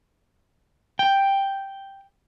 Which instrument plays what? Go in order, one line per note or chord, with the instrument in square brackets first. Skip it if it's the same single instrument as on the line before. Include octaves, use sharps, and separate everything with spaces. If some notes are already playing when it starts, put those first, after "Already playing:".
[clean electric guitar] G5